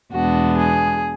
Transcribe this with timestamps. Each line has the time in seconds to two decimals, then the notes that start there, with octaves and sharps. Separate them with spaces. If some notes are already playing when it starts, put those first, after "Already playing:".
0.12 E2 B2 G#3 B3 D4 F#4
0.59 G#4